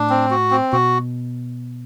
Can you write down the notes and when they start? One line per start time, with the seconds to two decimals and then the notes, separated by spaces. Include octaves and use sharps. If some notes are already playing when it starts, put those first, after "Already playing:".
Already playing: A2 D4
0.10 C4
0.31 F#4
0.51 C4
0.72 B2 F#4